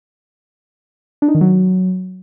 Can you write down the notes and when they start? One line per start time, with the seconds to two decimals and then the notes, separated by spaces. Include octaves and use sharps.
1.22 D4
1.28 D#4
1.35 D#3
1.41 F#3